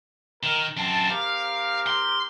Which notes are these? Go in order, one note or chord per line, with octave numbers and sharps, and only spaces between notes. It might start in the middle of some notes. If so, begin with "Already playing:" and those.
D#3 A#4
F#2 C4 A5
C4 G4 A#4 F5
C6